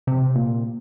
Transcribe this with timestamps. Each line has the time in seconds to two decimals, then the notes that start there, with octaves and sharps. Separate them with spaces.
0.07 C3
0.36 A#2